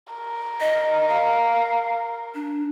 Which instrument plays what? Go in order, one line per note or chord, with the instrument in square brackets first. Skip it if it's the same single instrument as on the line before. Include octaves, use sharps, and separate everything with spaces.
[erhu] A#4
[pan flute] D#5
F5
D4